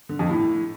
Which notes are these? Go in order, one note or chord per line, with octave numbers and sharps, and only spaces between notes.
D3
F2
A2